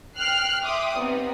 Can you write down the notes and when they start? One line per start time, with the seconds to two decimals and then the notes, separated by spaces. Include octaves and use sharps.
0.17 G5 F6 F#6 C7
0.65 E5 G5 C6 D6 D#6
0.97 G3 B3 C4 D#4